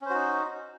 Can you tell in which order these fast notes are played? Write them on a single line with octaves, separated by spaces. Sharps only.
C#4 C5 F#4 D#4